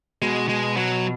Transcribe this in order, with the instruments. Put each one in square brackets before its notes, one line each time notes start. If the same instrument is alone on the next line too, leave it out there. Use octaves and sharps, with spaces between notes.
[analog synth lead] B2 [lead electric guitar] G#3
[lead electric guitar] G#3
F#3